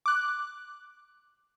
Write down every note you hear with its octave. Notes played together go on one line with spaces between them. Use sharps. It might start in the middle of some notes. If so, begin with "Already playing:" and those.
D6 F#6